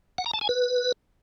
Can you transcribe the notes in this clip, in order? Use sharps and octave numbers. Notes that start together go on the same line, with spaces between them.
F#5
A#5
A5
G#5
B4